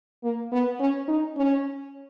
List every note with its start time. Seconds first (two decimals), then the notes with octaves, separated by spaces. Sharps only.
0.24 A#3
0.52 B3
0.80 C#4
1.08 D#4
1.37 C#4